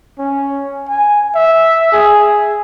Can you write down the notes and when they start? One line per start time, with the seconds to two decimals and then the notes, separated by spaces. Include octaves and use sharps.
0.19 C#4
0.89 G#5
1.35 E5
1.92 G#4